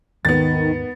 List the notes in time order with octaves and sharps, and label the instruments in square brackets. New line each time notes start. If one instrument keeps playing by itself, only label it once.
[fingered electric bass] D#2 G#2 G#3 [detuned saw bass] D#3 [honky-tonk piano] B3 A6